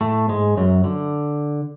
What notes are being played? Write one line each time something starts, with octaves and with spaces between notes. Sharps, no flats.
A2 A3
G#2 G#3
F#2 F#3
D3